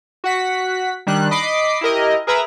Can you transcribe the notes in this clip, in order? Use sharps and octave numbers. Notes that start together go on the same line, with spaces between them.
F#4 F#5 B6
D#3 G3 D4 F#6
D#5 B5 D6 C7
E4 G4 A#4 D#5
G#4 A#4 B4 E5 A#5 B5